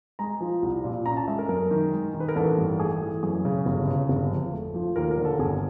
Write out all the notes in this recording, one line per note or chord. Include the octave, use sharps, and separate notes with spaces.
G#3 A#5
F3
C2
A#2
C#4 A#5
A5
G#3 E5
A#4
F#2 A#4
D#3
G#3
D#3
B4
A#4
A1 A4
G2
A3 G#4
E3
F#2 G#4
C#3
G1
C#3
G1
F2
A3
F3
D#2 A#4
A#4
D3
A4
G1 G#4